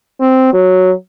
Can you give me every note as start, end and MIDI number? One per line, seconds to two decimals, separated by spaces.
0.21 0.49 60
0.53 0.91 54